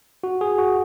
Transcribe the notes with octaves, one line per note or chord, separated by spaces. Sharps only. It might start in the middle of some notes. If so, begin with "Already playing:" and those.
F#4
G#4
F#4